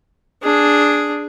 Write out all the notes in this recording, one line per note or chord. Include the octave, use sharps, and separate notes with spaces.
D4 G#4